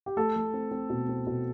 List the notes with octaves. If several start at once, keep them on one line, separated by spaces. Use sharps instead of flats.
G4
A3 A4
A3
C4
C4
B2
C4
B2